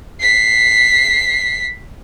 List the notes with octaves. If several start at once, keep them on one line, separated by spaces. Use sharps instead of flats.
B6 C7